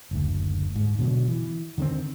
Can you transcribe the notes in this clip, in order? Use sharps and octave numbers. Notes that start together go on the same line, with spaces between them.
F#1 D2
G#2
B2 D3 F3 F#3
E3
D3 D#3 G#3 C4